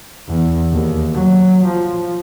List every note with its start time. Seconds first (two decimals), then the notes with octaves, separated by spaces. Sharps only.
0.28 E2
0.71 D#2
1.14 F#3
1.66 F3